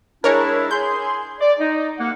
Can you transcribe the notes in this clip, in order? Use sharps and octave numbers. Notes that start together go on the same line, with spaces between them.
G#3 D4 E4 A#4 C#5
G#4 C6 G6
D5
D#4
C2 A#3 F#5